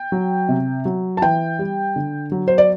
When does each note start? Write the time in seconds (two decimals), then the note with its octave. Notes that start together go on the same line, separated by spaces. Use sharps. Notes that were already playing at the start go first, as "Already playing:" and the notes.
Already playing: G5
0.12 F#3
0.49 C3
0.85 F#3
1.17 A5
1.22 E3 G5
1.59 G3
1.96 D3
2.32 F#3
2.48 C5
2.58 D5